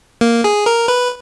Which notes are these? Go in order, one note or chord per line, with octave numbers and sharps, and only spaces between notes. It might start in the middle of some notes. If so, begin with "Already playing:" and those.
A#3
G#4
A#4
B4